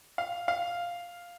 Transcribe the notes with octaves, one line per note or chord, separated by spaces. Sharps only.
F5
F5